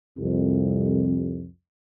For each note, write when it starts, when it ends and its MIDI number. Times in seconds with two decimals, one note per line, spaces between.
0.18 1.45 36
0.18 1.45 41